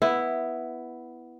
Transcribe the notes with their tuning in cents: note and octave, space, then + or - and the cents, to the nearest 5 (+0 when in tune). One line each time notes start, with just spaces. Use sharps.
B3 +0 E4 +0